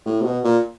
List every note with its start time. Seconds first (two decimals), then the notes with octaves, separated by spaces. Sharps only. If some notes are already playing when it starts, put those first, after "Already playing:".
0.06 A2
0.21 C3
0.25 B2
0.44 A#2